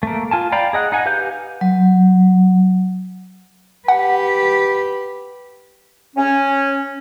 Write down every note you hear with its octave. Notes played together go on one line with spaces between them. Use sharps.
A3 A#3
F4 G#5 A5
D5 F5 G5 A#5 B5
G#4 D#5 F#5
D#4 F#5 G#5
G4 B4 F5 G#5 G6
F#3
G4 B4 F#5
C#4